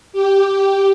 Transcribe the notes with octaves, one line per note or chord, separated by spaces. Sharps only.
G4